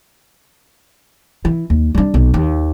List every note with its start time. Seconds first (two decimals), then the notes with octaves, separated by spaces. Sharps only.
1.45 E3
1.70 D#2
1.95 G3 D4
2.14 B1
2.34 D#2